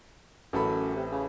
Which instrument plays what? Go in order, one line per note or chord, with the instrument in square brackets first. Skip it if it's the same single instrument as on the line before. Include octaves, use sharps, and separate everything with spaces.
[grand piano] A1 A4 B5 [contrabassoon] F#2
[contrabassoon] C3
C#3